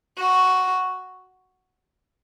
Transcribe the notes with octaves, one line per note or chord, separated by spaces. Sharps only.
F#4